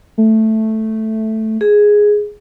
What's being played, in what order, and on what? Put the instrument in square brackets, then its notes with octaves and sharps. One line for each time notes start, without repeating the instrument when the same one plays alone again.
[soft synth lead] A3
[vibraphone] G#4